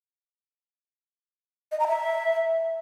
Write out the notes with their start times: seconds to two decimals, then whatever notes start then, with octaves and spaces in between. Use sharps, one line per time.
1.72 D#5
1.80 A#5
1.88 E5